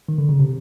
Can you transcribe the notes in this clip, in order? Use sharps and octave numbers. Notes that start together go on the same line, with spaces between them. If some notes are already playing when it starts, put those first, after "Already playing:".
D#3
D3
C#3
C3